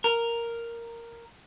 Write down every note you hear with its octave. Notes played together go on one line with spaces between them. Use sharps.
A#4